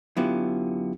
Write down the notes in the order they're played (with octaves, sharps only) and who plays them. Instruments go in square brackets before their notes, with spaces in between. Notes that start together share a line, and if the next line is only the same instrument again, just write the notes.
[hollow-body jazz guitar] F#2 D3 B3 [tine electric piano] E4 F4 G4